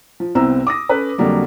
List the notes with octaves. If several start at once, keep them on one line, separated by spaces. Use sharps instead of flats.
F3
C2 B3 C4 E4 A#5 E6
D6 D#6 A#6
C#4 A4 B4
F2 D3 F#3 G3 A#3